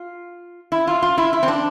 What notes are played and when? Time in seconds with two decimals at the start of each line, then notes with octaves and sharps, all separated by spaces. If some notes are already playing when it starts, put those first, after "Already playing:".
Already playing: F4
0.72 E4
0.87 F4
1.02 F4
1.18 E4
1.33 E4
1.43 C4
1.48 D4